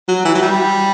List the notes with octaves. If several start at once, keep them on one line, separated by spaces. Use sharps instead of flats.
F#3
E3
F#3
G3